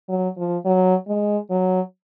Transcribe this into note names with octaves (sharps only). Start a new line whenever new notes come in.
F#3
F3
F#3
G#3
F#3